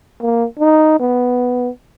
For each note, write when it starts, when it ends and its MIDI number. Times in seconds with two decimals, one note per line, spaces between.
0.22 0.45 58
0.59 0.96 63
1.00 1.69 59